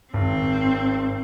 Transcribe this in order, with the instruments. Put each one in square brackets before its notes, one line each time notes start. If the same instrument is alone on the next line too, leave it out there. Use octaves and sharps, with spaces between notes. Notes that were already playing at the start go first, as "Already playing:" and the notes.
[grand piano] G#1 [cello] C4